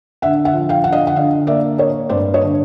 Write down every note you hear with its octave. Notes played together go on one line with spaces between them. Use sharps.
D3 E5 F#5
E5 F#5
F3
F5 G5
D3 F#5
D#5 F5
F#5
D3 D#5 F5
A#3 D5 E5
A#3 C#5 D#5
G2 C5 D5
C#5 D#5
D3